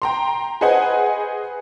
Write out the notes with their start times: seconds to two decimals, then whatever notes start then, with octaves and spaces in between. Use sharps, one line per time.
0.02 G5 A#5 C6
0.61 G#4 B4 C5 D#5 F#5 G#5